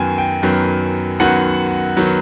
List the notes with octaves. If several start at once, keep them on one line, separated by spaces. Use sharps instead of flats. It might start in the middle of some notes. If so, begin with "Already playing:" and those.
Already playing: F#2 D#3 F#3 B3 G5 G#5
G5
F#2 D#3 F#3 B3
F#2 D#3 F#3 B3 F#5
D#3 F#3 B3